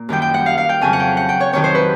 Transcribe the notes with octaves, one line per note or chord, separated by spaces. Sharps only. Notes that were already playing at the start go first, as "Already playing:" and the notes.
Already playing: A#2
F#2 D#3 G3 G5
G5
F#5
F5
F5
G5
F2 C#3 F#3 G#5
F#5
G5
F#5
G5
C#5
F2 C3 D#3 F#3 C#5
C5
B4